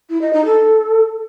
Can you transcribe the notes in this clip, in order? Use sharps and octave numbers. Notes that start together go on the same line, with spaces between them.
E4
D#5
D#4
A4